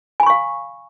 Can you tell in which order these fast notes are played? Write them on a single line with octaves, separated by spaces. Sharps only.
G#5 B5 C#6 F5